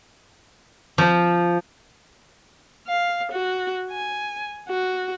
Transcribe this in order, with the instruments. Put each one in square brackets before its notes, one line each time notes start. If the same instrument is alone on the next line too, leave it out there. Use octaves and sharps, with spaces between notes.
[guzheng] F3
[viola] F5
F#4
G#5
F#4